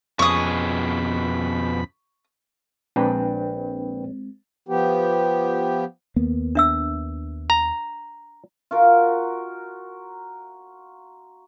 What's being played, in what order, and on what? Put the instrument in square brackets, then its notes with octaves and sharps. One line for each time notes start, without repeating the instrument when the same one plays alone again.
[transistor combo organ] F2 B5 [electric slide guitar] B2 C#4 G#4 [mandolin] C#6 D#6
[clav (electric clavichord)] A#1 [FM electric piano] G#3 C4 [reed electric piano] D4 B4 G5
[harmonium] F3 B3 G4
[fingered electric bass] D#2 A#3 B3
[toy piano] D4 E5 E6
[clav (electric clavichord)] A#5
[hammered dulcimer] F4 F#4 A#4